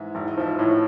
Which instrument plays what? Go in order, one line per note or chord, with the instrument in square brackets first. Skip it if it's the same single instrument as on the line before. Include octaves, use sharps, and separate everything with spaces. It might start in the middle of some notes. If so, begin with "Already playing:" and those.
Already playing: [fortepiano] G#2 [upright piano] E3 E4
[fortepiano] G#1 [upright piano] E4
[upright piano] D#4
[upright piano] E3 E4 [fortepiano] F3
[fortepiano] A2 [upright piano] E3 E4